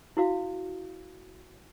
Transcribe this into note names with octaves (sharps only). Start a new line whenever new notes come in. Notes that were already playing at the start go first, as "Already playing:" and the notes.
E4 F#4 F5